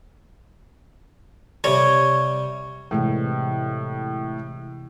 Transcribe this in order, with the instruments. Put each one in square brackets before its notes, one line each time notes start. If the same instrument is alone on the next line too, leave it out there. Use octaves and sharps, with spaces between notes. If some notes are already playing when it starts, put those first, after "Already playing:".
[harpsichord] C3 G3 [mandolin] C#5
[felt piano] A2 [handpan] C3 E3 G#3